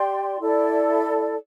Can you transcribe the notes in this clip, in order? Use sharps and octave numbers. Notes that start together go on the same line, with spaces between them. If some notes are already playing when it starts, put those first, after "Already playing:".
Already playing: G4 D5 G5 C6
E4 A4 D5